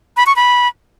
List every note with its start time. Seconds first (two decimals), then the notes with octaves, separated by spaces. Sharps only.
0.17 B5
0.26 C#6
0.36 B5